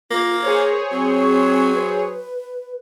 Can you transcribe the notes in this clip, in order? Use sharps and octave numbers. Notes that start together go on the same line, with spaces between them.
A#3 F4
G#4 A#4 C5 C#5
F#3 C4
B4